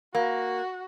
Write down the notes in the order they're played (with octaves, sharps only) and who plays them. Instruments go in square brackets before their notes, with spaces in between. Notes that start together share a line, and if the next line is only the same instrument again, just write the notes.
[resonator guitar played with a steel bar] A#3 [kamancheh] F#4